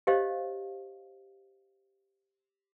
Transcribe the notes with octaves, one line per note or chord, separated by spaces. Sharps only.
G4 C5 C#5 D#5 F5